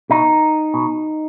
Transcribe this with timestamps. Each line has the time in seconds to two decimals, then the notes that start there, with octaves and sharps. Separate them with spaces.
0.10 B2 D#4
0.74 B2